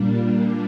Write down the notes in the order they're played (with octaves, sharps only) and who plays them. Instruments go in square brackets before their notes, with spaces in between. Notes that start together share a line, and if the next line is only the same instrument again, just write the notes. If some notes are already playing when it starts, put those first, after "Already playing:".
Already playing: [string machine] A#2 G3 A#3 D4